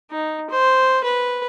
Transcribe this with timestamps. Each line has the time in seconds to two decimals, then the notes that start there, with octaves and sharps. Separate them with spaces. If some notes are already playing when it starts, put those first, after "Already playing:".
0.11 D#4
0.50 C5
1.04 B4